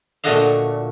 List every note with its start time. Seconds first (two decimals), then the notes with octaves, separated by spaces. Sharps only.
0.24 A#2 D3 A3 F#4 D#5 F5